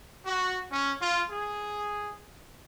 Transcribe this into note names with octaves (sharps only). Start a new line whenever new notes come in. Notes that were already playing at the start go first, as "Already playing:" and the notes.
F#4
C#4
F4
G#4